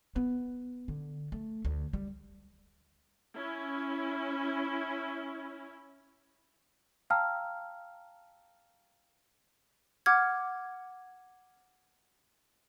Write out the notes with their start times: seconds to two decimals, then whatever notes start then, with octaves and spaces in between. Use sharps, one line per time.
0.16 B3
0.88 D3
1.32 A3
1.65 D2
1.93 G3
3.35 C#4 E4
7.10 F5 G5 A5 A#5 E6 F6
10.06 F#5 D6 F6 G#6